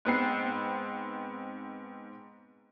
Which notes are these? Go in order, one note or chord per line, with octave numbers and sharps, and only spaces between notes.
G#2 B3 C4 C7